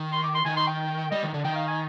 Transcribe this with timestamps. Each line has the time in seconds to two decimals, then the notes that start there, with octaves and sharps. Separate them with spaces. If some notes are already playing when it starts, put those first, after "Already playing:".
Already playing: D#3
0.13 C6
0.24 D6
0.35 C6
0.45 D#3 G#5
0.57 C6
0.67 G5
1.11 G3 D#5
1.23 D#3
1.34 D3
1.45 D#3 G5
1.56 F5
1.68 G#5